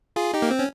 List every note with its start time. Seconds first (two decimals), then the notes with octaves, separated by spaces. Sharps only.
0.16 F4 G#4
0.34 D#4 G4
0.42 A#3
0.51 C4
0.59 C#4